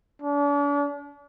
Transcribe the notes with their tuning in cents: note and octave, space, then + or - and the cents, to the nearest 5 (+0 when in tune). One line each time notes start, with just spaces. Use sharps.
D4 -40